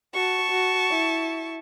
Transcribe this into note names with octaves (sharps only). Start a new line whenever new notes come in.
F#4 A5 C#6
F#4
E4